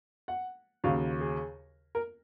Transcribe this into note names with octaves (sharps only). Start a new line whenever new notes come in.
F#5
D#2 C#3 F#3 F5
G#4
A#4